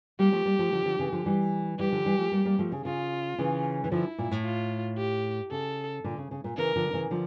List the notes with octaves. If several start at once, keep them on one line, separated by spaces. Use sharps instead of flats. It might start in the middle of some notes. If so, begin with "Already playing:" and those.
G3 A#3 G4
F3 A3
G3 A#3
F3 A3
D3 F3
D3 F3
C#3 E3
D3 F3
E3 G3
E3 G3 G4
D3 F3
E3 G3
F3 A3
G3 A#3
G3 A#3
F3 A3
C#3
C#3 F4
C#3 E3
E3
D3 F3 E4
A#2
A2
F4
G4
C#3 A4
A#2 D3
C#3
C#3
A#2
C#3 E3 A#4
D3 F3
F3
C#3 E3
D3 F3